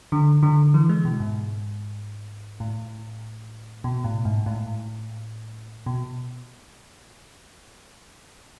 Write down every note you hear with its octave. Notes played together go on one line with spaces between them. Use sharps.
D3
D3
E3
G#3
B2
G#2
A2
B2
A2
G#2
A2
B2